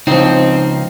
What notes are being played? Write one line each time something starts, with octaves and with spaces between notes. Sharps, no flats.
C#2 F3 C4 D#4